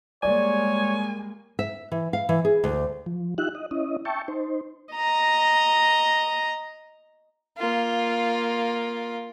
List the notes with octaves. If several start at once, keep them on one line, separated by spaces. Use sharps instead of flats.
G3 G#3 A#3 C#5 D5 G#5
E5
E3
F5
E3
G#4
D2
F3
D#4 F4 G4 E5 F#6
D#5
C#4 E4 D#5
E5 G5 A5 C#6
D#4 C5
D#5 A#5
A#3 F4